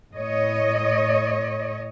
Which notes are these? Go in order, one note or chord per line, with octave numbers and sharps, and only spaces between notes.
A2 C#5 D#5